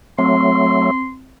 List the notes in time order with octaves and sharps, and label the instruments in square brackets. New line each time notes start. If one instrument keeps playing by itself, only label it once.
[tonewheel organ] F#3 A3 [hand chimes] C4 [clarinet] C6